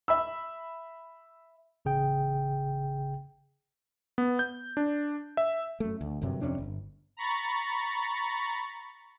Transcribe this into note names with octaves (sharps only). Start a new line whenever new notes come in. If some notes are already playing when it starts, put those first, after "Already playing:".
E5 B5 E6
A1 C#3 G#4 G5
B3
G6
D4
E5
F#2 A3
D2
G1 F#2 C3 F#3
F2 C3 C#4 D4
G1
A#5 B5 C#6 A6